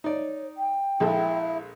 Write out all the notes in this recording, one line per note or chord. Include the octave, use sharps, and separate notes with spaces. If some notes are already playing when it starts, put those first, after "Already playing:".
D#4 C#5 D5
G5
A#1 G#3 E4 A4